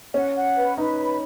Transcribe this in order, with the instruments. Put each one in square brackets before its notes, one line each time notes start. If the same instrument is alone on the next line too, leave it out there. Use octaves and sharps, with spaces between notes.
[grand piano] C#4 [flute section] F#5
[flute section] F#5
B4
[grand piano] D#4 [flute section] B4
[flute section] B5